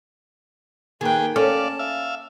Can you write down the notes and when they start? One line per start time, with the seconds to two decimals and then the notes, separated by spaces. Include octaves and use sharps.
1.01 D#3 A#3 G#4 B4 G5
1.36 C#4 A4 D5 F5 A5
1.79 E5 F5